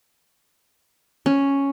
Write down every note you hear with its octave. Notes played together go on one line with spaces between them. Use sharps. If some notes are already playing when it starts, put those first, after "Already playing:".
C#4